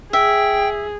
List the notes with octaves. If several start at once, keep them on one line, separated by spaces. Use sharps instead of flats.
G#4 E5 G5